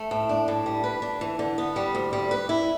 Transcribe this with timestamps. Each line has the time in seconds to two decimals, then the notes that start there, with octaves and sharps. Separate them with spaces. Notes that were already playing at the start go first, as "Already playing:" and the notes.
Already playing: A3
0.11 A2
0.29 D4
0.48 A2
0.66 G3
0.84 B4
1.02 D4
1.21 E3
1.39 D3
1.58 B3
1.76 G3
1.95 D2
2.13 G3
2.31 B4
2.49 E4